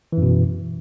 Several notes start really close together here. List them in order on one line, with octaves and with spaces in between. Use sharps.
E3 F#2 B2